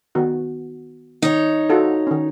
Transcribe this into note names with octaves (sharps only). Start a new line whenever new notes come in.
D#3 B3 F#4
D#3 D#4 C#5
F4 F#4 A4
D#3 C#4